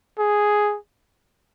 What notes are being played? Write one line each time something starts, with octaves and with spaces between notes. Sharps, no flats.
G#4